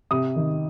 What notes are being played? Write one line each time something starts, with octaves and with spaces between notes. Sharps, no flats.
C3 D#6
D#3